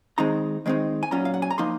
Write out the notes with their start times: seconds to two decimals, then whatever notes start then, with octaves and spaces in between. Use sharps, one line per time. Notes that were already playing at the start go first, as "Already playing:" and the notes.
0.18 D#3 G#3 C4 D#4 A#5
0.66 D#3 G#3 C4 D#4
1.03 G#5
1.11 A#2 F#3 C#4 F4 A#5
1.25 F5
1.34 F#5
1.42 G#5
1.51 A#5
1.58 F3 A#3 D#4 C6